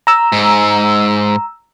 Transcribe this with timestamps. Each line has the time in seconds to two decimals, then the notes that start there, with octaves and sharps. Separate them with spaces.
0.07 A#5 E6
0.32 G#2